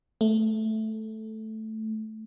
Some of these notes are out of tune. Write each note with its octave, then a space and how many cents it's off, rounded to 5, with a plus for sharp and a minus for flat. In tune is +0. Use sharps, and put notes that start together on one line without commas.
A3 -5